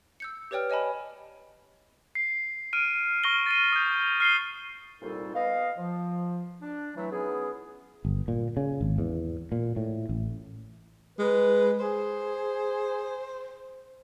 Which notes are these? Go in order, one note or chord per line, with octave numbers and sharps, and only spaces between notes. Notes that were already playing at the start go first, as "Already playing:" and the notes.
E6 G6 C#7
G4 B4 C#5 D5 G5 F6
C#5 D#5 G#5 A5 B5
C7
F6 D7 D#7
C#6 F6 A#6 G7
A6 C7 D#7
D#6 G6
F6 C7 D#7 G7
C2 A#2 G3 D#4 F#4 A4
B3 D#5 F5
F3
D4
E3 F#3 A3
F#3 B3 C#4 D#4 E4 G#4
G1
A#2
C#3
G#1
E2
A#2
A2
A1
G#3 B4
G#4 C5